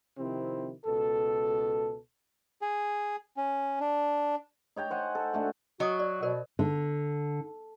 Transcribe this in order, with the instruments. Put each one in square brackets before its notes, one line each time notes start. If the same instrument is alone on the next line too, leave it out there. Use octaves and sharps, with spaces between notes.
[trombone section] C3 D#3 F3 C4 E4
C#2 B2 A4
[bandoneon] G#4
C#4
D4
[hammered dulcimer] D#4 C#5 G5 A#5
C5 F#5 G#5
A4
D3 A3 F#4
[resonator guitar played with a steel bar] F#3 [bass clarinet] F#4 [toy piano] D#5 C#6 D#6
[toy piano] D5
[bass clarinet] B2 [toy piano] A#4 C5 D5
[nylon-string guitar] D3